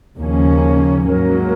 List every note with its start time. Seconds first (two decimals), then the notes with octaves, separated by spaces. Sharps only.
0.17 D#2 C#3 F3 A#3 C#4
1.08 G#2 F#3 A#3 C#4 A#4